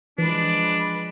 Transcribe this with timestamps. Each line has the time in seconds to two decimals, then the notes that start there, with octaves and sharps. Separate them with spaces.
0.18 E3 F3 G#3 D4 B4